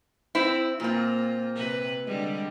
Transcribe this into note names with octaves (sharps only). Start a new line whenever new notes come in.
C4 E4
A#2 A#3 C4 F4
C3 B4
D3 G3 G#3